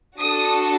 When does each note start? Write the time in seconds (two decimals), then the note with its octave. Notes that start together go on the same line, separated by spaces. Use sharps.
0.20 D4 F#4 A4 D#6